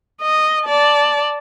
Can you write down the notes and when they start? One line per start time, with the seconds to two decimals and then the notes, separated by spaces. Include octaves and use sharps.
0.22 D#5
0.66 D5 A5